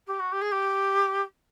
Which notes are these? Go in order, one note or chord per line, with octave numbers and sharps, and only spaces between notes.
G4
F#4
G4
G#4
G4